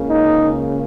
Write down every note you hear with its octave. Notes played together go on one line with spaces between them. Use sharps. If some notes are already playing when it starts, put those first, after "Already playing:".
Already playing: C#2 C#3 A#3
D#4